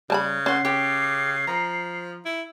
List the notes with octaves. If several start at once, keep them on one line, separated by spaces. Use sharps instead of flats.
C#3 G3 A5 B5
C#4 F#5 C6 C7
C#3 G4
F3 A#5
E4